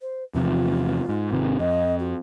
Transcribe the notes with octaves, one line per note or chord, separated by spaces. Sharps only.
C5
E2 C3 F3 F4
G#2
G#1 C3 D#3
F2 D#5
F#4